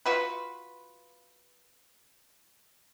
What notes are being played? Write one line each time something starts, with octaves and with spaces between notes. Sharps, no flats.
F4 F#4 B4